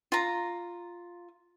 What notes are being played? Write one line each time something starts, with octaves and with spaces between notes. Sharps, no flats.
F4 A#5